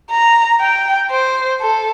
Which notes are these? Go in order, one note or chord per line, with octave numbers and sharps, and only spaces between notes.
A#5
G5
C5
A4